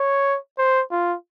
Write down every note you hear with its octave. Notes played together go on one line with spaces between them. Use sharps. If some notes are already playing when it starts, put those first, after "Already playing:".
Already playing: C#5
C5
F4